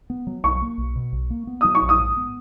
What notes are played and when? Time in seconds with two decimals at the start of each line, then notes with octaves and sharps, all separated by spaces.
0.10 B3
0.27 F#3
0.44 B1 C#6
0.62 A#3
0.78 B1
0.96 B2
1.12 B1
1.30 A#3
1.47 B3
1.61 F#3 D#6
1.75 C#6
1.82 A#1
1.89 D#6
1.99 G#2
2.17 B3